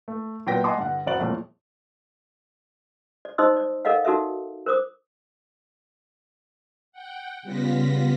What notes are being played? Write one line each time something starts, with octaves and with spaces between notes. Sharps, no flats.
A3
A#2 F#3 B3 G5 A#6 B6
D#5 F#5 G#5 A5 C6 D6
G2 D3 F#5
F1 F#4 C5 D5 F#6 F#7
E1 F2 A#2 A3 E4
D5
D#4 C5 D#5 C6 D#6 E6
D5
A4 A#4 D5 D#5 F5 F#5
D#4 F#4 A4 A#4 E5
A#4 C5 D6 D#6
F#5 G5
C#3 G3 B3 F4 A#6 B6